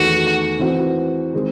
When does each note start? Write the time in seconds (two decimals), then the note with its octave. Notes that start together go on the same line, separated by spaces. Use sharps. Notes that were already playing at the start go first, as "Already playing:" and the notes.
Already playing: E2 D#3 A3 F#4
0.59 E3 C4 F#4
1.33 D#3 G#3 C4